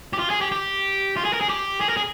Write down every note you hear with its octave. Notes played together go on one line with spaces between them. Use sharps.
G4
F4
G#4
G4
G4
F4
G#4
A#4
G#4
G4
G#4
A#4
G#4